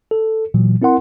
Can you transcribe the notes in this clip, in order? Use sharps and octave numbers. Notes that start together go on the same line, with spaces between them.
A4
A#2 E3 F#3
C4 E4 A#4 F#5 C6